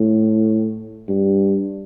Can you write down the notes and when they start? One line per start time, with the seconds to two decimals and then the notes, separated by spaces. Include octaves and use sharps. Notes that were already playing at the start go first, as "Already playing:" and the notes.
Already playing: A2
1.08 G2